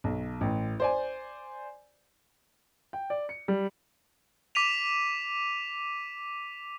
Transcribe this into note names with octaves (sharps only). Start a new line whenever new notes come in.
B1
A1
C5 D5 G#5
G5
D5
C#7
G3
D6 B6 D#7 F7